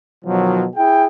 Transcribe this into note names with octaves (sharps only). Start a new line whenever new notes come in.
B2 D#3 F3 F#3
E4 G#4 G5